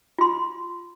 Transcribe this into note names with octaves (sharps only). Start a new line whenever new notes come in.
F4 C6